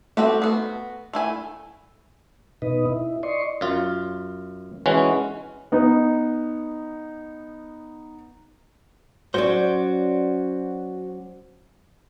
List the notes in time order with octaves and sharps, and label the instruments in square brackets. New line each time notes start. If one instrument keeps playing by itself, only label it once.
[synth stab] A3 [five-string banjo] C4 F#4 G4
[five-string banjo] B3 F#4
A3 E4 G#5
[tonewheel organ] B2 D#4 B4 D#5
E4
D5 D#5 C6 C#6
[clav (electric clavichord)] F#2 F4
E3 G#3 C#4 F#4
[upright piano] B3 D#4
[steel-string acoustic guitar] F#3 C#4 D5 [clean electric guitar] F#4 C5